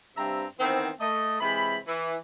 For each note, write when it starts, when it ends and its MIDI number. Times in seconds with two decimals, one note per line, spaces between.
0.17 0.44 43
0.17 0.44 48
0.17 0.44 55
0.17 0.44 60
0.17 0.44 76
0.17 0.44 82
0.59 0.89 51
0.59 0.89 52
0.59 0.89 59
0.59 0.89 60
1.00 1.37 57
1.00 1.37 75
1.40 1.77 48
1.40 1.77 52
1.40 1.77 56
1.40 1.77 72
1.40 1.77 83
1.86 2.15 52